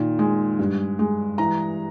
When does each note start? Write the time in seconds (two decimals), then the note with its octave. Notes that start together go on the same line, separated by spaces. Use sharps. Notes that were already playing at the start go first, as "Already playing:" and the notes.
Already playing: A#2 D#3
0.19 G#3
0.59 G2
0.99 G#3
1.38 E3 A#5